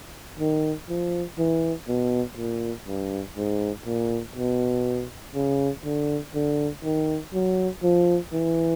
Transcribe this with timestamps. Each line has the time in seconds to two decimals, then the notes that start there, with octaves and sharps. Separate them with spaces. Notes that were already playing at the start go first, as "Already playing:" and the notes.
0.39 D#3
0.89 F3
1.38 E3
1.88 B2
2.37 A#2
2.87 G2
3.36 G#2
3.86 A#2
4.35 B2
5.35 C#3
5.85 D3
6.34 D3
6.84 D#3
7.33 F#3
7.83 F3
8.32 E3